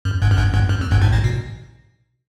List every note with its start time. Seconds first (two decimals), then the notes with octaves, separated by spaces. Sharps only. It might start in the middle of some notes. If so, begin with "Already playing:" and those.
0.05 F#2
0.22 G1 G2
0.31 F#2
0.37 G1 G2
0.54 G1 G2
0.69 F#2
0.81 F2
0.91 G1 G2
1.02 G#1 G#2
1.12 A1 A2
1.24 B2